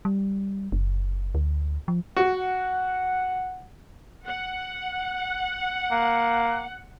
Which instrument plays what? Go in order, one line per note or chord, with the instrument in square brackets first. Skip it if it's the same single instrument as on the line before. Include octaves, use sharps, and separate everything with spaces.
[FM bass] G3
F#1
D2
F3
[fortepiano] F#4 [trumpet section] F#5
[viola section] F#5
[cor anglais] A#3